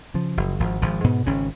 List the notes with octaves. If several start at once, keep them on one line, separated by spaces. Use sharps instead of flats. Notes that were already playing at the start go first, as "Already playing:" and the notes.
C#3 F3
F#1
G#1 F3
G#1 F3
G#2 B2 B3
G#1 C#3 C#4